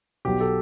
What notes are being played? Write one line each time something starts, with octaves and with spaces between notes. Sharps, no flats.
B1 B2 G4
A4